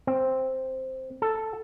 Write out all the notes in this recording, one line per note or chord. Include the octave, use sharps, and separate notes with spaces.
C4
A4